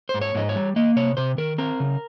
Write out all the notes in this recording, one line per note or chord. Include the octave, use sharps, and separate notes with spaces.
C5
G#2
C#5
G#2 D#5
C#5
G3
A#3 D#5
C3 C#5
C3 C5
D#3 A#4
C4 A#4
C#3